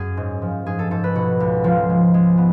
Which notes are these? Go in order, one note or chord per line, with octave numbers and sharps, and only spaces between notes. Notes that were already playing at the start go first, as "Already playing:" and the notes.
Already playing: F#2 G#4
G#2
F3
G#2 G#4
A4
G#2 A4
B4
B2 F#4
C#2
F3 F4
G#3
G#3
B3